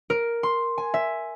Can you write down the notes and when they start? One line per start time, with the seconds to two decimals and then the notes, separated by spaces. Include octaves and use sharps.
0.10 A#4
0.43 C6
0.78 G#5
0.94 E5